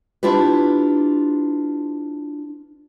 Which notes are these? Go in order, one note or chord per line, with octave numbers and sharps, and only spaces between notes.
D4 E4 F4 G4 B4